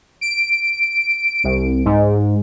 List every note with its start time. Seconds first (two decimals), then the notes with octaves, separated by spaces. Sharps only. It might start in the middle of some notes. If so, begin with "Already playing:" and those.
0.21 D7
1.44 C2
1.85 G#2